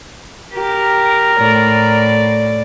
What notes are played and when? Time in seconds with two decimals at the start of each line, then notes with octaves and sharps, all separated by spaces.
0.54 G4 A#4
1.39 A2 D5